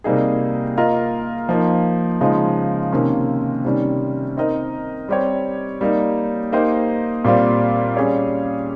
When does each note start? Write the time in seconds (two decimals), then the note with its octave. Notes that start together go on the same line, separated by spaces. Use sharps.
0.04 C3 G3 A#3 D#4 G#4
0.77 A#3 F4 A#4 D#5
1.49 F3 A#3 D#4
2.21 C#3 F3 G#3 D#4
2.92 C3 D#3 A#3 C#4
3.65 C3 D#3 G3 C#4
4.37 C4 D#4 A#4 D#5
5.09 G3 C4 G4 C#5
5.81 G3 A#3 D#4
6.52 A#3 D#4 G4 C5 D#5
7.25 A#2 G3 C4 F4
7.97 G3 C#4 G#4 C#5